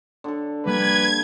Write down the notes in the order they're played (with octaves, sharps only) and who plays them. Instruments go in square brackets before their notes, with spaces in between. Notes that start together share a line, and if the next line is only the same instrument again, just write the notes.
[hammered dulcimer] D3 A4
[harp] G3 A#3 [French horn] B4 [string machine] G#6